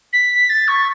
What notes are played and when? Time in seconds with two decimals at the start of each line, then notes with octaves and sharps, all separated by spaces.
0.13 B6
0.49 A6
0.68 C#6